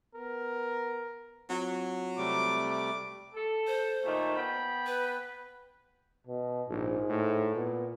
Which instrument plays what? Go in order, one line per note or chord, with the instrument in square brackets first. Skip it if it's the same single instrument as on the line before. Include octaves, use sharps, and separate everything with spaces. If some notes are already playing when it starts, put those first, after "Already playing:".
[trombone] B3 [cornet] A#4
[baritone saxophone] F#3 [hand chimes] C4 F4 F#5
[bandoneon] C3 G3 A3 [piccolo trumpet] D6
[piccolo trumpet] D6
[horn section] A4
[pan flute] C5
[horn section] A#2 D#3 A3
B3 G5 B5
[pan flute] B4
[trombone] B2
[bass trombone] A#1 [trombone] G#2
[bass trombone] A2
[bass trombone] A#2 [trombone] B3